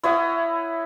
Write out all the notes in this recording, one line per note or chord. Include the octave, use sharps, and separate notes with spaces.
E4 C#5 D#5 F#5